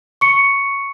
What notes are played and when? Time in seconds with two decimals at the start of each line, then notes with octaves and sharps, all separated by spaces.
0.21 C#6 C#7